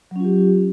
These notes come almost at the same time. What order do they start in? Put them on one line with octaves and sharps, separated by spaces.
F#3 C#4 F4 G4